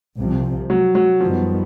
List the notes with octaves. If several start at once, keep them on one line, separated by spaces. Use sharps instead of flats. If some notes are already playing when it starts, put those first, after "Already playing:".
C2 C3 F3
F#3
F#3
F#2 D#3 F3 G3 B3